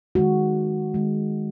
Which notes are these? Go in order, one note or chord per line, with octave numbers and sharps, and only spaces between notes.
D#3 G#3 F#4
D#3 G#3